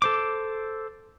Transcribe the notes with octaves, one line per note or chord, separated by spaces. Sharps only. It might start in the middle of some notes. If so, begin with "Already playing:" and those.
A4 C5 D6